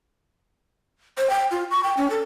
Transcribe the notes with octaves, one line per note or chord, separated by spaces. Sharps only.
C5
G5
F4
C#6
G5
C#4
A4